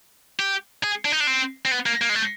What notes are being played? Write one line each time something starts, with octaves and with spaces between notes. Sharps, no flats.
G4
G#4
D4
D#4
D4
C4
C4
B3
A#3
A#3
G#3
A3